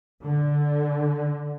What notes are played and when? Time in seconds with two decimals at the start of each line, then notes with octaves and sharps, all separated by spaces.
0.21 D3